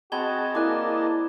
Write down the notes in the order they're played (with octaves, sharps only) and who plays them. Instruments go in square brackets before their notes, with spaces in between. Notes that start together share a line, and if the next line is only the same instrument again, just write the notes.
[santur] C4 [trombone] F#4 [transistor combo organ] G#4 D#5 A5 [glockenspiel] B5 G#6 G7
[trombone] A#3 [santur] E4 D5 G#5 [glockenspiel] D6 F#6